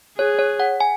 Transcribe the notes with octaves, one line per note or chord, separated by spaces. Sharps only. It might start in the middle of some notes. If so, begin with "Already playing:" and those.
G#4 C#5
C#5
F#5
G#5